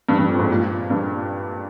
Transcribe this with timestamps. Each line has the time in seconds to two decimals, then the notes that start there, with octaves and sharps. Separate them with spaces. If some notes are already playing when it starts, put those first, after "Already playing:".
0.09 G2
0.19 G2
0.29 F2
0.39 G#2
0.50 A#2
0.90 G2